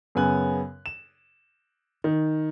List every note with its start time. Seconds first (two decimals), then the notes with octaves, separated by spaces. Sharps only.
0.15 F#2 C#3 B3 G#5 F#6
0.86 E7
2.04 D#3